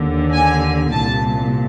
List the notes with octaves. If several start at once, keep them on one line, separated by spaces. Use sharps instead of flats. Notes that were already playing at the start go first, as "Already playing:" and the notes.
Already playing: D#2 D3
G#5
C2 A#2 A5